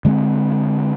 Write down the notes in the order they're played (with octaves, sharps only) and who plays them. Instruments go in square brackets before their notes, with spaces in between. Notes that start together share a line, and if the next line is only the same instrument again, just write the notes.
[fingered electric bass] D3 G#3 A3 C4